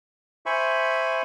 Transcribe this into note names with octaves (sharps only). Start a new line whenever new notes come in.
C5 E5 G#5 B5 C#6